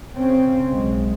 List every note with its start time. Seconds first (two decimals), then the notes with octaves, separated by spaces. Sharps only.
0.15 C#3 C4 C#4
0.69 B1 G#3